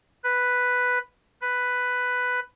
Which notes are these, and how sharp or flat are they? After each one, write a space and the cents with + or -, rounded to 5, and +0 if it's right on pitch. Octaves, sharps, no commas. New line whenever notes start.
B4 +0
B4 +5